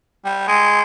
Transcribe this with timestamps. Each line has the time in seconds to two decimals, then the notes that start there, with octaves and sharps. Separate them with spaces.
0.25 G3
0.48 G#3